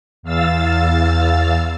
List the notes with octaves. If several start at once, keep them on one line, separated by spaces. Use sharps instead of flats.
E2 F5 E6 A6